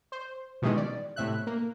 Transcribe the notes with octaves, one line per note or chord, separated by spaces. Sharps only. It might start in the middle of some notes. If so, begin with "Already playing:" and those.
C5
B2 D#3 E3 G3 G#3 C#4
D5
A2 C3 E5 F#6
A#3